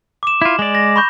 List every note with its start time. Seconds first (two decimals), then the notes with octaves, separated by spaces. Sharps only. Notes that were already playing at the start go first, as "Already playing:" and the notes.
0.23 D6 E7
0.42 E4 F4
0.59 G#3 D5
0.75 A#6
0.96 B5 C#6 G6